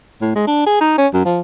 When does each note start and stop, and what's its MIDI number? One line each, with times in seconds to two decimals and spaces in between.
0.21 0.35 45
0.36 0.43 56
0.47 0.62 62
0.66 0.76 68
0.81 0.97 63
0.98 1.07 61
1.13 1.25 42
1.25 1.41 53